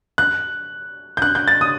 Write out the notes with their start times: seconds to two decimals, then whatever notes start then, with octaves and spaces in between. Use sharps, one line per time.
0.18 F#6
1.17 G6
1.22 F#6
1.35 G6
1.48 A6
1.61 D#6